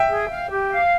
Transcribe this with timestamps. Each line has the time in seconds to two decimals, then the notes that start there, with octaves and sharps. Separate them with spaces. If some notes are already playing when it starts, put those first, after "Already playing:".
Already playing: E5 G5
0.09 G#4
0.29 F5
0.50 G4
0.70 F5